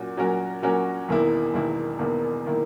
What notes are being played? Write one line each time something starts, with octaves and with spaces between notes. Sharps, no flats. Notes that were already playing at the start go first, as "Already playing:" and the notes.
Already playing: A#2 F#3 C#4 F#4
A#2 F#3 C#4 F#4 A#4
A#2 F#3 C#4 F#4 A#4
E1 E2 D#3 A#3 E4
E1 E2 D#3 A#3 E4
E1 E2 D#3 A#3 E4
D#3 A#3 E4